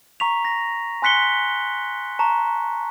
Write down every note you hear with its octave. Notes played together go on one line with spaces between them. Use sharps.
A#5 C#6 B6 F7
A#6
G#5 C6 F#6 B6 C#7 G7
A5 A#5 C#6